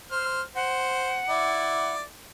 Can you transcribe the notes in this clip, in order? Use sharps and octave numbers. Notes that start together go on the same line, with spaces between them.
C5 F6
C5 F#5
E4 D5